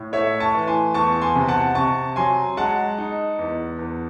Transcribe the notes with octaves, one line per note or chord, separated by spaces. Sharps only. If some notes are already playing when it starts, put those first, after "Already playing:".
Already playing: A2
A3 C#5 E5
A5 C#6
E3
G#5 C6
E2 A5 C#6
G#5 C6
C3
F#5 A5
C3 A5 C#6
F#3 G#5 C6
G#3 F#5 A5
D#4
E2
E2